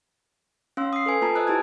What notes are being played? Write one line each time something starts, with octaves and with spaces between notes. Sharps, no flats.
C#4 F5 C6 E6
D#6 C7
A4 B4 G#5
A#3 F4 B4 A5 A#5
C5 D#5 G#5 D#6 E6 F#6
E4 G4 A5 G#6